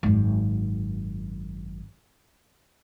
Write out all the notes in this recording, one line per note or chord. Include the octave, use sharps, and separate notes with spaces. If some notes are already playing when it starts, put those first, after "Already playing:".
G#1 F#2